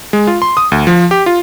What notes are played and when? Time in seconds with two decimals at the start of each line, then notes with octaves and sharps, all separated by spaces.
0.13 G#3
0.27 F4
0.42 C6
0.57 D#6
0.72 D2
0.87 F3
1.11 G4
1.26 F4